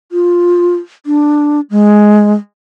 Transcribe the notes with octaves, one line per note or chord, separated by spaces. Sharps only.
F4
D4
G#3